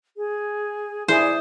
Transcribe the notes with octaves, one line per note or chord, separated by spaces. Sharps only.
G#4
E4 G#4 C5 D5